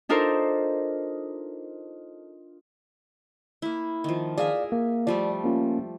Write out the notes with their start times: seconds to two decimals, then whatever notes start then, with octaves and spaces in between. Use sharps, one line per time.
0.09 D4 D#4 F4 A4 A#4 C5
3.62 A#3 E4
4.04 D#3 F3
4.38 G#4 A#4 D5 E5 F5
4.72 A#3
5.07 F3 G3 A3 D5
5.44 A#3 C#4 F4